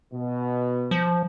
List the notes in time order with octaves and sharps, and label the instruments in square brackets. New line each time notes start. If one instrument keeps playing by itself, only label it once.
[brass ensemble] B2
[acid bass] F3